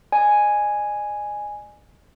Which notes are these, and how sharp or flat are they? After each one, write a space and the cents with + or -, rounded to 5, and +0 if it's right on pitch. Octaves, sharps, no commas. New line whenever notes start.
D5 +45 G#5 +0